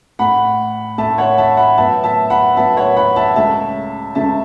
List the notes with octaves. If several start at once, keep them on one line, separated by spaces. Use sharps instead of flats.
A2 A3 F#5 B5
A2 A3 E5 A5
C#5 F#5
E5 A5
F#5 B5
A2 F#3 B3 E5 A5
E5 A5
F#5 B5
A2 F#3 B3 E5 A5
C#5 F#5
F#5 B5
E5 A5
C#2 C#3 A3 E5 A5
C#2 C#3 A3 E5 A5